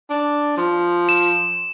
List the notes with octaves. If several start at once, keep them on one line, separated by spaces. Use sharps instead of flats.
D4
F3
E7